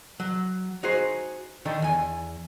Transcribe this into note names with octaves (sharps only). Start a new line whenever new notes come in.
F#3
D#4 F#4 G#4 C5
D3 D#3 D#4
E2 G#5